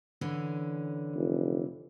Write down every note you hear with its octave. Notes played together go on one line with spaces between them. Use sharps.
D3 E3 C#4
F1